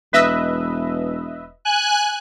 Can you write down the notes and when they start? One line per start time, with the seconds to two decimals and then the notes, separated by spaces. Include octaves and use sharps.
0.13 E1 B4 D#5 E5
1.65 G#5 F#6